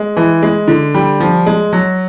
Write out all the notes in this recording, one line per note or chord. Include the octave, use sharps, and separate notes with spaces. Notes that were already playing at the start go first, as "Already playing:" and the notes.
Already playing: G#3
E3
G#3
D3
G3
F3
G#3
F#3